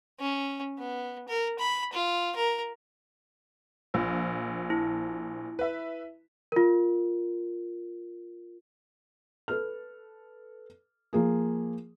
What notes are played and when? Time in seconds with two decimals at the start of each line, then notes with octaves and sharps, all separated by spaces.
0.19 C#4
0.78 B3
1.28 A#4
1.59 B5
1.93 F4
2.36 A#4
3.94 A#1 F3
4.70 E4
5.59 B4 E5
6.52 F4 A#4
9.48 A4 B4 F6
11.13 F3 A#3 G#4